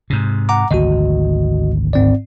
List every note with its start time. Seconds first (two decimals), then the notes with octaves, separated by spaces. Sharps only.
0.10 G#2 C3
0.49 F#5 A#5 D6
0.71 G#1 D2 F#4 D#5
1.93 G#2 C4 D5